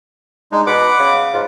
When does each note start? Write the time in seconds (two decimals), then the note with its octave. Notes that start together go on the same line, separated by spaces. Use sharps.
0.52 G#3 D4 D#4
0.67 B2 B4 F#5 D6
0.99 C#3
1.34 G#2 F4